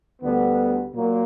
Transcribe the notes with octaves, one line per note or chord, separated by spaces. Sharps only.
D2 D3 G3 B3
A#2 F#3 A#3